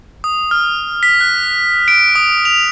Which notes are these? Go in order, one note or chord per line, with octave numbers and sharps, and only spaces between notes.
D#6
F6
B6
F#6
D7
D#6
F7